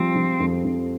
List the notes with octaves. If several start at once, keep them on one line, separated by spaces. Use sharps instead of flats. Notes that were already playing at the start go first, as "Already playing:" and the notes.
Already playing: F3 G3 C4
F3
F2
F2